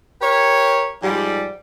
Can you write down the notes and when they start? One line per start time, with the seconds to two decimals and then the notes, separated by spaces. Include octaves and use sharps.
0.22 G4 A#4 C#5
1.03 G#2 F3 G3